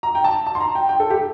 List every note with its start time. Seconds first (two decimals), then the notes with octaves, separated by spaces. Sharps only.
0.03 A#5
0.15 G5
0.24 A5
0.47 A5
0.55 C6
0.60 A#5
0.75 G5
0.89 G5
1.00 A4
1.10 G4